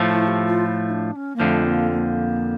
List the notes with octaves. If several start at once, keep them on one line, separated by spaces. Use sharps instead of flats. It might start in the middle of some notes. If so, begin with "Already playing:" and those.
Already playing: A2 F3 A3
E4
G4
F4
E4
D4
C#4
A#3
F2 D3 F3 A3
A#3
A#3